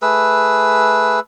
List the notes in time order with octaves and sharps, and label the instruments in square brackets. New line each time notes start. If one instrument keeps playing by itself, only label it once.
[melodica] A3 G#4 B4 E6